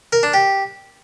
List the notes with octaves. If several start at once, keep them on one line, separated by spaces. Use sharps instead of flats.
A#4
D4
G4